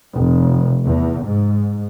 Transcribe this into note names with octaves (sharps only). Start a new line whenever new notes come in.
F1
E2
G#2